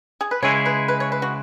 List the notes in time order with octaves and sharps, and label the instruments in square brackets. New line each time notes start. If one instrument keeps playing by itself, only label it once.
[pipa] G#4
B4
[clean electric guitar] C#3 G#3 E4 G#4 [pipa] C#5
[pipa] B4
B4
C#5
B4
F#4